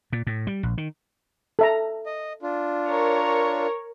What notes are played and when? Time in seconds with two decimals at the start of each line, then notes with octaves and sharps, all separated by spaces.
0.13 A#2
0.27 A2
0.47 G3
0.63 A#1
0.78 D#3
1.59 A4 E5 A#5
2.06 D#5
2.43 D4 F4
2.88 A#4 C#5